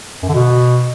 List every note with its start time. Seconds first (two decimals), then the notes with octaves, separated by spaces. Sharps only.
0.23 F#2
0.29 D3
0.34 B2